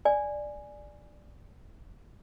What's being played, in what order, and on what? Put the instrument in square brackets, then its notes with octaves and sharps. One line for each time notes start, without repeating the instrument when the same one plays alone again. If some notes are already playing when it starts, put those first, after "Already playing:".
[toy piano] D5 G#5